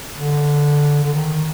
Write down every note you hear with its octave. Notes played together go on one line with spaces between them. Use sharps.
D3
D3
D#3